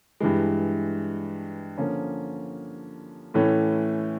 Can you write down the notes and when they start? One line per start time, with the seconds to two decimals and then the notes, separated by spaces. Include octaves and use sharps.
0.20 G2 E3 G#3
1.78 D3 F3 A#3 C#4
3.34 A2 E3 A3 C#4